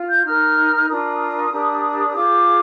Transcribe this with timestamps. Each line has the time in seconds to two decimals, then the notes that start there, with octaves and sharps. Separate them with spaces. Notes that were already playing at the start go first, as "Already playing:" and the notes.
Already playing: F4
0.09 G6
0.25 D#4 A#4 F6
0.89 D4 F4 A#4 D#6
1.52 D4 G4 A#4
2.16 F4 G#4 C5 D6